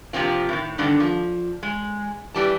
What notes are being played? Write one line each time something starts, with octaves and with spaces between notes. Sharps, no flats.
C3 F3 A#3 C4 F4
A2 D#3
G2 B2 D3 D#3
F3
G#3
E3 G3 A5